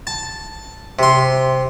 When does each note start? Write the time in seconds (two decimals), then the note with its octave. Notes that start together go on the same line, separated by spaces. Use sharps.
0.07 A5
0.99 C3 C6